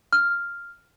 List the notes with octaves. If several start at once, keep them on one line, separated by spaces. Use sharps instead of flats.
F6